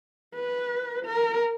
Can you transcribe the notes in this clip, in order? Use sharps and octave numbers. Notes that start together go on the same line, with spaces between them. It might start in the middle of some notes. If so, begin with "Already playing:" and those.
B4
A#4